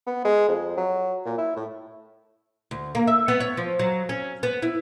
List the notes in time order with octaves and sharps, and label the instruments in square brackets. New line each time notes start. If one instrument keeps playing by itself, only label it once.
[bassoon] B3
G#3
F2
F#3
A#2
E4
A2
[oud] D2
A#3
E5
B3
C#5
F3
F#3
C#4
B3
E4